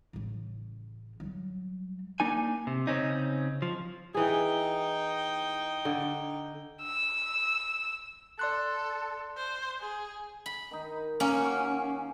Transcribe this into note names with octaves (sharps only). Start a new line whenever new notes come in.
A1 C#3
F#3 G3
A#3 D4 D#4 G#5
C3
C#3 C4 C#4 D#4
F3
E3 D#4 G#4 G5
D3
E6
A4 D5 C6 F#6
C5
G#4
B5
D#3 D#4
A#3 C#4
F#4 G4
F5